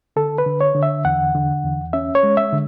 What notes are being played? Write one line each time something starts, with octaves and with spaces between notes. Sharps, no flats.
D3 A4
B4
D3
C#5
D3
E5
E2 F#5
D3
E2
C#4 E5
C#5
G#3
E5
D3